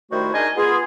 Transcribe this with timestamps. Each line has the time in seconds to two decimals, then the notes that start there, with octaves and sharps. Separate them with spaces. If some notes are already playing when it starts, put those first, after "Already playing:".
0.12 D#3 G3 A3 E4 F#4 C5
0.34 D4 D#4 G#4 A#4 D#5 G#5
0.57 B3 F4 G#4